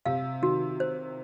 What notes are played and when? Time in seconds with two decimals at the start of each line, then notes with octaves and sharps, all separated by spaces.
0.05 C3 F5
0.42 D#3 F#4
0.80 C5